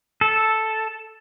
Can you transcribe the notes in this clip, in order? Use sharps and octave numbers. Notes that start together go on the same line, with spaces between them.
A4